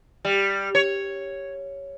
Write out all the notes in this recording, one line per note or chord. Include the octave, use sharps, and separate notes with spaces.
G3
C#5